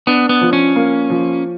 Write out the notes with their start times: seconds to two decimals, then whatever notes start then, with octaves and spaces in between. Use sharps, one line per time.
0.07 B3 D4
0.29 B3
0.41 F3
0.53 C#4
0.76 A#3
1.10 F3